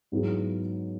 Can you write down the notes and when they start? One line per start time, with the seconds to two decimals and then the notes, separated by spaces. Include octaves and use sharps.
0.12 G#2 F#3 B3 E4 G#4